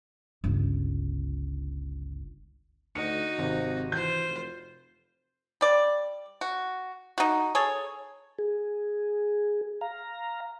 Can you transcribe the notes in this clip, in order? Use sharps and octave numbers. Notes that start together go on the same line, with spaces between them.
G1 C#2
D2 D#4 F#4 C#7
G#1 C3
E3 F4 C5 G6
F1
G3 D5
F#4
D#4 F#4
G#4 A4 C#5
G#4
F5 A#5